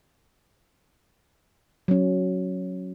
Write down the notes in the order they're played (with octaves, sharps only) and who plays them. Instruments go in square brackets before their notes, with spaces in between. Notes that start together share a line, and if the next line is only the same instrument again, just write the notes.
[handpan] F#3 C#4